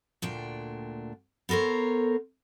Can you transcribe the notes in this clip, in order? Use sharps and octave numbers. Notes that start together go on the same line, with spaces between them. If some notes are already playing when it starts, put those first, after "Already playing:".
D2 A#2 D4 G5
B3 A4 A#4 C5 C#5